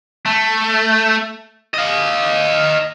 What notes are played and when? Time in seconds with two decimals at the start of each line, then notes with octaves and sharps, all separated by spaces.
0.26 A3
1.74 D#5 F5